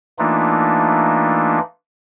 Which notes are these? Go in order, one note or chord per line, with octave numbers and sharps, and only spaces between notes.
E3 A3 A#3 D4 D#4 F4